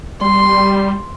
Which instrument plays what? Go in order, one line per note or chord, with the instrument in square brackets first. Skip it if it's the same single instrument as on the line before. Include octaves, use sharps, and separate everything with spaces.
[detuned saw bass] G3 [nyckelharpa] C6